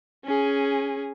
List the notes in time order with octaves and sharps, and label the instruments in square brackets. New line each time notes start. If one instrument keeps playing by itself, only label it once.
[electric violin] C#4 G#4